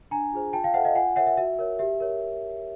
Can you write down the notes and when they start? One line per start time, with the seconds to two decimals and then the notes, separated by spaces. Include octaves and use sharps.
0.11 D4 G#5 A#5
0.33 F4 G#4 C5
0.53 F4 G5 A5
0.64 F5 G5
0.74 A4 C5 E5 F#5
0.85 D#5 F5
0.95 F4 F#5 G#5
1.16 A#4 C#5 E5 F#5
1.27 E5
1.37 F#4 E5
1.59 A#4 C#5
1.79 G4 E5
2.00 A#4 C#5